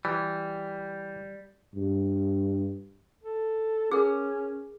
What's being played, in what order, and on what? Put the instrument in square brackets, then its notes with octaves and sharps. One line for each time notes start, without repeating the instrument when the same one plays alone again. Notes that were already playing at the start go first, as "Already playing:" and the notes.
[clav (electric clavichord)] E3 [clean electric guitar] G3
[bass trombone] G2
[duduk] A4
[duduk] C#4 [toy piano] G#4 A#4